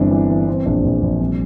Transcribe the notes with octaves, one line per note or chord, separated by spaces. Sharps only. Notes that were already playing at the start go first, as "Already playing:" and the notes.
Already playing: G1 E3 C4 D4
E3
E3
E3 C4
A#1 D4
A#1
A#1
C2